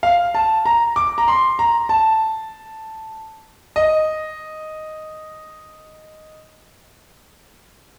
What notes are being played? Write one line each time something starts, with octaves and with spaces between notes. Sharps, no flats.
F5
A5
A#5
D6
A#5
C6
A#5
A5
D#5